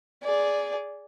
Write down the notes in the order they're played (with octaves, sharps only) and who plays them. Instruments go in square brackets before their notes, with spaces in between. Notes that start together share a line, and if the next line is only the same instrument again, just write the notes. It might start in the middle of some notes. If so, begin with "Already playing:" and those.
[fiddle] G#4 D5